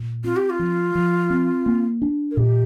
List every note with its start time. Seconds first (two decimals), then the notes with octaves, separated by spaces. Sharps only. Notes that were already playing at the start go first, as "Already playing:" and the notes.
Already playing: A#2
0.24 C4 F4
0.36 G4
0.50 F4
0.59 F3
0.95 F3
1.30 C4
1.66 A#3
2.02 D4
2.31 A#4
2.37 A#2 G4